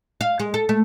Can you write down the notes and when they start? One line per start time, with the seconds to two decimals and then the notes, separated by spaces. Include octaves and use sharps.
0.21 F5
0.39 G#3
0.54 A4
0.69 A3